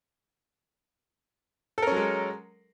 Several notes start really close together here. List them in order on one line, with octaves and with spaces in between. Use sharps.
A4 A#4 C#4 F#3 G#3